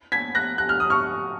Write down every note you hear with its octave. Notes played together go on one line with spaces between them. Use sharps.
G#6 B6
F#6 A#6
F#6
F6
D#6
C#6 F6